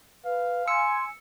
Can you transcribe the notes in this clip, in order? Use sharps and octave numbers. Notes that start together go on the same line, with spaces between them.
B4 F5
G#5 C6 E6 C#7